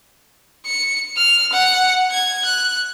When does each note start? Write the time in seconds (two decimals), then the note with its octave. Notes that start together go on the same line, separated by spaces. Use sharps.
0.66 C#7
1.16 F6
1.52 F#5
2.11 G#6
2.45 F#6